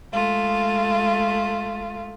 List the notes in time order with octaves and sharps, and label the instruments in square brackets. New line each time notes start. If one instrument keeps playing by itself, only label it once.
[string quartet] G#3 A3 F4